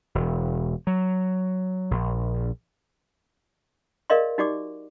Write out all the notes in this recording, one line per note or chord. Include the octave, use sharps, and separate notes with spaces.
E1
F#3
A#1
G#4 A#4 D5 D#5 F5 C6
D#4 F#4 G4 D5 D6